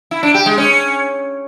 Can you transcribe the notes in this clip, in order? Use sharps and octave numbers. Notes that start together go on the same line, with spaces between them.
E4
D4
G4
G#3
C#4